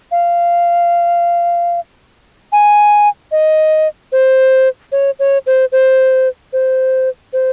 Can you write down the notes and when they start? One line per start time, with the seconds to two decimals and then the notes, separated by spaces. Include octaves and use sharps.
0.11 F5
2.52 G#5
3.32 D#5
4.12 C5
4.92 C#5
5.19 C#5
5.46 C5
5.72 C5
6.53 C5
7.33 C5